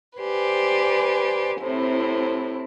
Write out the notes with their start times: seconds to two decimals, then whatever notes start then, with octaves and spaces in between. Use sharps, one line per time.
0.20 G4 B4 C5 D5 G#5
1.61 A2 C3 C4 E4